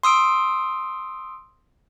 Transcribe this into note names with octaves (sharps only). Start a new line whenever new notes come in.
C6 D#6 E6 D7